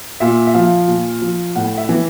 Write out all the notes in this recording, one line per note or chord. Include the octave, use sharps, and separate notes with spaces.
A#2 E5
E5
F3 F5
A#2
F3
A2 F#5
E5
E3